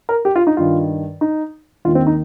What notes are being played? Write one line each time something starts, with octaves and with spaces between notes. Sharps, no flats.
A#4
G4
F4
D#4
G2 D#3 F4
D#4
D#2 D#3 F4
C4
D#4